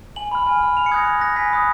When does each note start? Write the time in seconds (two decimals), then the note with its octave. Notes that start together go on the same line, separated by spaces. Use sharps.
0.16 G#5 F#7
0.32 B5 F6
0.46 G#5
0.61 B5 F6
0.76 G#5 F7
0.86 C#7
0.91 D#6 F#6 G#6 A#6
1.06 G#5 G#6
1.21 D#6 F#6 A#6
1.36 G#5 B6
1.51 B5 D#6 F#6